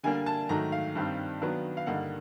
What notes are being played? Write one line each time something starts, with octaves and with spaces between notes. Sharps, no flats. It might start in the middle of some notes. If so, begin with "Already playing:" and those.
D3 G3 A#3 D4 G#5
A5
G#2 D#3 F#3 A3 A#5
F5
G2 D#3 G3 C4
D#3 F#3 B3 D4
F5
G2 D3 G3 A#3 D#4 F#5